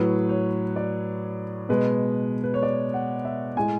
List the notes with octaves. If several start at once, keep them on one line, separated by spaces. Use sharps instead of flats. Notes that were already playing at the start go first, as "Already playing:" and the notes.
Already playing: A2 F#3 B4
C#5
D5
B2 G#3 B4
B4
C#5
D5
F#5
E5
A2 G#3 G#5